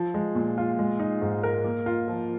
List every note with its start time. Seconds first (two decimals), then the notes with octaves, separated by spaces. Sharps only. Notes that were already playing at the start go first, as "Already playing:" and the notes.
Already playing: F3
0.14 G#3
0.35 A#2
0.58 F4
0.79 G#3
1.00 D#4
1.22 G#2
1.43 A#4
1.64 A#3
1.86 F4
2.08 F3